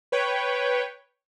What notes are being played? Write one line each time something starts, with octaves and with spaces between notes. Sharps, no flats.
B4 C#5 G5